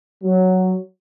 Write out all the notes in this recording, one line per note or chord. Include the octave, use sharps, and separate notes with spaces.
F#3